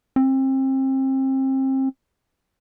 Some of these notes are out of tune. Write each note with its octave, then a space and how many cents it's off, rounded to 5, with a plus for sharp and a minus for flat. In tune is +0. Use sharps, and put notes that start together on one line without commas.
C4 +30